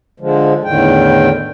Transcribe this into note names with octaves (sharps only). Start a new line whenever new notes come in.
D3 F3 G#3
E2 A2 D3 D#3 G5